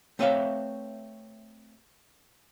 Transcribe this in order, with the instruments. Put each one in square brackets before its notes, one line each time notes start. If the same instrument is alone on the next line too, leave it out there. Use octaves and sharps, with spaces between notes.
[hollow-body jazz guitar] A3 C4 B4 C#5 E5 F5